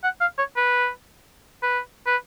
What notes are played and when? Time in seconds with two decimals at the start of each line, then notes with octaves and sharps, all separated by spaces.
0.03 F#5
0.20 F5
0.38 C#5
0.56 B4
1.63 B4
2.07 B4